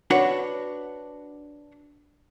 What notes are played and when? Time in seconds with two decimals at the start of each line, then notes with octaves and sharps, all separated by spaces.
0.10 D4 F#4 B4 C#5